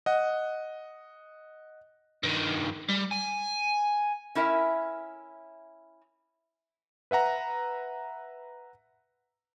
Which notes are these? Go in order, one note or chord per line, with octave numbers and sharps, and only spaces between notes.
D#5 F#5
G2 D#3
G3
G#5
C#4 E4 A#4 E5
B4 E5 F#5 A#5